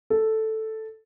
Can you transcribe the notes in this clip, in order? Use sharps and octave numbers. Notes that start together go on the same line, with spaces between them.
A4